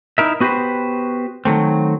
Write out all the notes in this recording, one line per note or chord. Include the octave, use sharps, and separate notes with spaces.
D#4 E4 A#4 E5
B3 F#4 G4 B4 C5
D#3 F#3 A3 C4